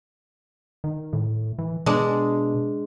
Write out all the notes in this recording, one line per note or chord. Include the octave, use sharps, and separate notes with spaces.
D#3
A2
E3
B2 G#3 D4